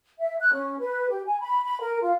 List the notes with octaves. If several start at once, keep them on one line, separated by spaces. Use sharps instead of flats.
E5
F#6
C#4
B4
G4
G#5
B5
B5
A#4
F4